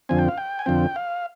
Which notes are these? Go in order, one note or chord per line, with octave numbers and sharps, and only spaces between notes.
F2 D3 F3 C4 G#5
G5
F5
G5
G#5
F2 D3 F3 C4 G5
F5